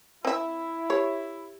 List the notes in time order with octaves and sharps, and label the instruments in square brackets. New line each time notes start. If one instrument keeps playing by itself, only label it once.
[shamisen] C4 E5 [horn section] E4
[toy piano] G4 [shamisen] C#5